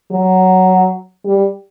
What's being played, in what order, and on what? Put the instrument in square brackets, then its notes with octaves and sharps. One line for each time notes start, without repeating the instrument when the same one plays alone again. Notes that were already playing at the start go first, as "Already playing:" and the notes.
[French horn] F#3
G3